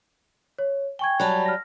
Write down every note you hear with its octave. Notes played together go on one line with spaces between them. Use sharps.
C#5
G5 G#5 C#6 G#6
F#3 G3 A5 B5
F6 A#6